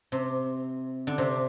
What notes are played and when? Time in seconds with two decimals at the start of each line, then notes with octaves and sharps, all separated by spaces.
0.12 C3
1.07 D3
1.18 C3